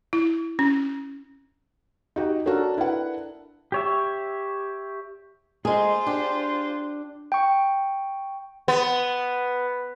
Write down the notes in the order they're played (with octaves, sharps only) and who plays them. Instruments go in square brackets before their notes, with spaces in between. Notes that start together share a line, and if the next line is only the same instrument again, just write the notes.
[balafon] E4
C#4
[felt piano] D#4 F#4 G4
[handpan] D4 A4 A#4 [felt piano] F#4 C#5
[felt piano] E4 B4 F#5
[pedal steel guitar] G4 C#5 E5
[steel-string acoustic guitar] G#3 A#3 [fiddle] F4 C5 [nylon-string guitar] G#4
[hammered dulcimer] D4 [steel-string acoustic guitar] G4
[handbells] G5 C#6
[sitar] B3